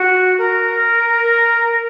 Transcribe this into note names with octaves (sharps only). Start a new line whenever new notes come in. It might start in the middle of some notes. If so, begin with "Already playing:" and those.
Already playing: F#4
A#4